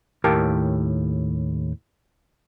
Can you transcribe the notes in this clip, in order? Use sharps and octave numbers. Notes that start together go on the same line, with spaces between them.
D#2 A2 G4 A#4 G5 A5